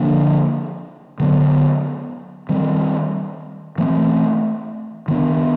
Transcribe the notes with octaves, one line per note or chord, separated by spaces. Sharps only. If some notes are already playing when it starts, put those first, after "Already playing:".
Already playing: D3 F3 A#3 D4
D3 F#3 B3
D#3 G3 C4
E3 A3 C4
D#3 G#3 B3 D4